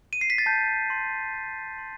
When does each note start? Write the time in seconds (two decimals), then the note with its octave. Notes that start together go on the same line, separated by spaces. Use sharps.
0.13 D#7
0.21 C7
0.30 B6
0.38 A6
0.46 A5 G6
0.90 C6
1.34 A5
1.78 C6